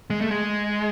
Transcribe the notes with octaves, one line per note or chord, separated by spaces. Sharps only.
G#3
A3
G#3